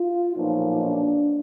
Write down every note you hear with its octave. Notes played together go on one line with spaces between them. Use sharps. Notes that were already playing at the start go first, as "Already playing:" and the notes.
Already playing: F4
B1 A#2 F3 D#4
D4